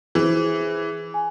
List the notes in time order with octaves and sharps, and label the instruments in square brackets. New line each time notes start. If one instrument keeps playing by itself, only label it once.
[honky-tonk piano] E3 [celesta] G#4 C5
[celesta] G#5